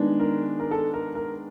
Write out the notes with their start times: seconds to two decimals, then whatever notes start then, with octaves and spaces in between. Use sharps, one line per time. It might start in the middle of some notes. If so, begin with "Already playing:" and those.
Already playing: D#3 G#3 B3 D4
0.20 A#4
0.60 A#4
0.71 A4
0.94 A#4
1.15 A#4